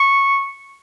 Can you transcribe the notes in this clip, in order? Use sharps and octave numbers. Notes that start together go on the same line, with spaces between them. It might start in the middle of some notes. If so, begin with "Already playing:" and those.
Already playing: C#6